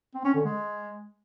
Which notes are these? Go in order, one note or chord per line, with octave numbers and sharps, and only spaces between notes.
C4
C#4
D3
G#3